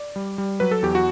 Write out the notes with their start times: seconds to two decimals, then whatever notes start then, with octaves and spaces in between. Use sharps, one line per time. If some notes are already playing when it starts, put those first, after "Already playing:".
Already playing: D5
0.16 G3
0.38 G3
0.60 F#3 B4
0.71 A4
0.82 E2 G4
0.95 F#4